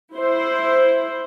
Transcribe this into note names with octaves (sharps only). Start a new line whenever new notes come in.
E4 C5